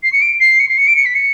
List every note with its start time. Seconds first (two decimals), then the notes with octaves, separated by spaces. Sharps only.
0.03 C7
0.13 C#7
0.22 D7
0.40 C7
0.59 C#7
0.68 C7
0.78 C#7
0.88 D7
0.96 C#7
1.06 B6
1.15 C#7